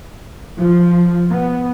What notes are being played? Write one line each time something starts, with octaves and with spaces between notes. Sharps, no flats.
F3
B3